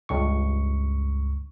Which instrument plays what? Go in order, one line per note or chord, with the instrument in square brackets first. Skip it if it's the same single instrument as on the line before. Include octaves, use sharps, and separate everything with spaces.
[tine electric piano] C#2 G2 C#6